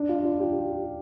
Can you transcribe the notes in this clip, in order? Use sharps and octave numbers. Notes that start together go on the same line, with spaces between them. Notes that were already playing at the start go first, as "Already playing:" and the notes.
Already playing: D4
F4
F4
G4